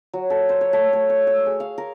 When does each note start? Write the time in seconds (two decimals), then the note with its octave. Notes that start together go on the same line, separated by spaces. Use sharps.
0.13 F#3
0.30 A4
0.49 C5
0.61 C#5
0.73 A3
0.93 C#5
1.10 C#6
1.27 E6
1.46 G#4
1.60 F5
1.78 A#4